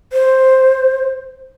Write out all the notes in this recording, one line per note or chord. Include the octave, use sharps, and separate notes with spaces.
C5